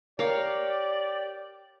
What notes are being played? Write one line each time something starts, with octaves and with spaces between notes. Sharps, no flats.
G4 A#4 C#5 D5 F5